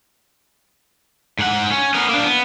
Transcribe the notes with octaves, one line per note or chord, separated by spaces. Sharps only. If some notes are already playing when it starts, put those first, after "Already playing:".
G#2 F#5
C#4
B3 A#4
A#3 D4
B3